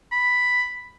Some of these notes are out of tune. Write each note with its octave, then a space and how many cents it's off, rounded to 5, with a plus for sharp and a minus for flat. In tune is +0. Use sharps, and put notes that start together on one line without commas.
B5 +5